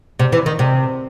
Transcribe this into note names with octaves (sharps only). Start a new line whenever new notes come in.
C3
E3
D#3
C3